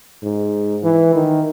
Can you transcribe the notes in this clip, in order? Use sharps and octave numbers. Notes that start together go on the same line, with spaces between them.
G#2
E3
D#3